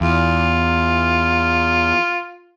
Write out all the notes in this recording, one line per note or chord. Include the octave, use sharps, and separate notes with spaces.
E2 F4